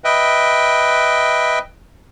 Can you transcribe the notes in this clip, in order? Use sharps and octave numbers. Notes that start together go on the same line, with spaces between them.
B4 D#5 E5 G5